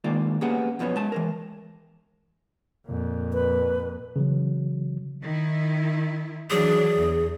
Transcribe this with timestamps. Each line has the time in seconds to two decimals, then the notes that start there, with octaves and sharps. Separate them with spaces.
0.04 D#3 G#3 A#3 F4 D5
0.41 A#3 B3 C#4 G4 G#4 F#5
0.79 F#2 B2 F3 B3 C#4
0.96 G#3 A5
1.12 E3 G#3 A#4
2.87 F2 A#2
3.33 B4
4.16 C#3 E3 F#3
5.23 D#3 E4
6.50 E3 F#3 D4 G#4
6.96 E2